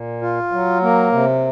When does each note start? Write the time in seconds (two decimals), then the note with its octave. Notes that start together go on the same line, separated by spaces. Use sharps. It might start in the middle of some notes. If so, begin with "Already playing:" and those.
Already playing: A#2
0.21 F4
0.52 F#3
0.83 A#3
1.12 C3